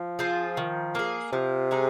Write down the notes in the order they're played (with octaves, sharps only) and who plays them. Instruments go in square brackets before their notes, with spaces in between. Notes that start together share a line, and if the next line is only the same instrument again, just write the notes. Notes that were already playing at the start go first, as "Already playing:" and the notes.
Already playing: [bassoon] F3
[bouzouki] C4 F4 G#4
D#3
A#3 G#4
[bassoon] C3 [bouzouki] F3
[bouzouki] G#3 D#4 G#4